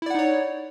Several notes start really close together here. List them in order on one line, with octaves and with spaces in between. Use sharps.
E4 D5 F#5 D#4 C#5